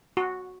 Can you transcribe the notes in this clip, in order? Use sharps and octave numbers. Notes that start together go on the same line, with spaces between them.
F#4